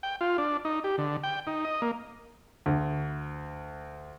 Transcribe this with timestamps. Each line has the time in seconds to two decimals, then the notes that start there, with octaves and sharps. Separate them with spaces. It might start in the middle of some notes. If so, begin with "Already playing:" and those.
0.03 G5
0.21 F4
0.38 D4
0.65 D#4
0.84 G4
0.98 D3
1.24 G5
1.47 D#4
1.65 D#5
1.82 A#3
2.66 D2